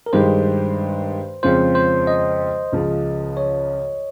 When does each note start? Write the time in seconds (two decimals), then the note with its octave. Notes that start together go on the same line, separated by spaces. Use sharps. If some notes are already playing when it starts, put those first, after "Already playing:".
0.06 A#4
0.13 G2 D#3 G#3 D#4 G4 C5
1.43 F2 C#3 G#3 C#4 F4 C5
1.75 C5
2.07 D#5
2.72 C#2 C#3 F3
3.37 C#5